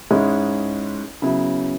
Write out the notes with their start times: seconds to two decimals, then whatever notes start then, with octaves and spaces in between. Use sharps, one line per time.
0.11 G#2 G#3 C#4 E4
1.22 C#3 F#3 B3 E4